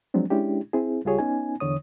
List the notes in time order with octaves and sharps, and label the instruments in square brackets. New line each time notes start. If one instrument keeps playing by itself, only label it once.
[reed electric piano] F3 F#3 G#3 C4 D4
G#3 C#4 D4 E4 G4
C4 E4 G#4
C#2 G3 F4 G4 G#4 C#5
B3 C#4 D#4 G#5
E2 D3 C#5 D#6